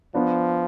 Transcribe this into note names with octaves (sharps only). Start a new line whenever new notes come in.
F3 B3 D4